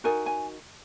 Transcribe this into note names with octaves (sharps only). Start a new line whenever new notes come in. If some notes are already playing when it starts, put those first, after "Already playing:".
D#4 F#4 A#4 G#5
G#5